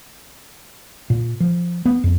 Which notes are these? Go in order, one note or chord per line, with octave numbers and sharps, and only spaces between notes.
A#2
F3
B3
F2